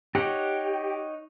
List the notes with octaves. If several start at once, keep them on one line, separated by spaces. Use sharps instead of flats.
D#4 G4 C#5 F#5